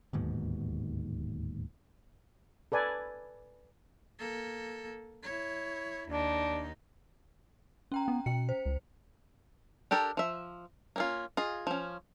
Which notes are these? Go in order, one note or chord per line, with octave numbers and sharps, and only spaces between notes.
D1 D#2 G#2 B2
A4 B4 D5 G#5
A#3 A4
E4 C#5
D#2 D4 D#4
C#4 G5 A#5
B3
B2 G5 C#7
C5
C#2
D4 G4 A4 A#4
F3 E5
A#3 C#4 F4
F4 G#4 D#5
F3 C#4